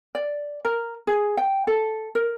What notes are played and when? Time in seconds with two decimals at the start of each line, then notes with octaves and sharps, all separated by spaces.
0.15 D5
0.65 A#4
1.07 G#4
1.37 G5
1.67 A4
2.15 A#4